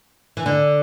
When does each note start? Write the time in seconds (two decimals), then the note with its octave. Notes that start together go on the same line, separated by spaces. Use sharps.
0.37 E3
0.46 D3